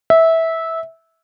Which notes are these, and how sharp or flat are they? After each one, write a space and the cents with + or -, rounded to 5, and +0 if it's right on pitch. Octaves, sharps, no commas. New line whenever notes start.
E5 -15